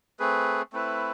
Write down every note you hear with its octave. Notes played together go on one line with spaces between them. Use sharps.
A3 C4 G#4 B4
A3 C4 E4 B4